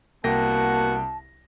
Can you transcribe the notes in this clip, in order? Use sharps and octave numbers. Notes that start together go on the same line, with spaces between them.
C2 A#3 B3 F#4 G5 A5 A#6